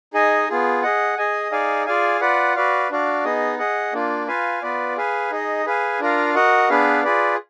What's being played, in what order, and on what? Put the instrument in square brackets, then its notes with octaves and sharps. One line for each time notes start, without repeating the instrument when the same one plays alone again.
[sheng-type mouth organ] D#4 G#4 D#5 G#5
B3 F4 G#4
G#4 D#5 F#5
G#4 D#5 G#5
D#4 G#4 D5 F5 G#5
F4 G#4 D5 F5 G#5
F4 B4 D5 F#5
F#4 B4 D5 F5
D4 F#4 D5 F5
B3 D#4 G#4 D#5
G#4 D#5 F#5
A#3 D4 F4
F4 B4 F5 G#5
B3 F4 B4 D5
G#4 B4 F5 G#5
D#4 G#4 D#5
G#4 B4 F5 G#5
D4 F4 A#4 F5
F#4 A#4 D#5 F#5
B3 D4 G#4 B4 F5
F4 G#4 B4 D5